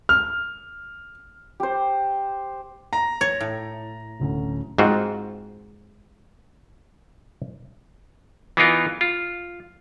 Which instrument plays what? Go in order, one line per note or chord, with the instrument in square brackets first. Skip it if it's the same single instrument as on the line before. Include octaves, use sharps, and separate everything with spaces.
[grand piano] F6
[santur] G4 C5
[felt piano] A#5
[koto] C#5 [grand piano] A6
[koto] A2
[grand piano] D1 D2 C#4
[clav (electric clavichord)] G#2 C4 F4 F#4
E3 B3 D#4 F4 A#4
F4